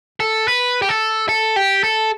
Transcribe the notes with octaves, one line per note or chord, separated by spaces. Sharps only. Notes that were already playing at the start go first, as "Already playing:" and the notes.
A4
B4
G4
A4
A4
G4
A4